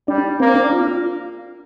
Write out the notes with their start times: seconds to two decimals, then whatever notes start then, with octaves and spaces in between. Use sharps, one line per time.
0.08 G3 D4
0.40 A#3 C4
0.55 D4
0.73 F4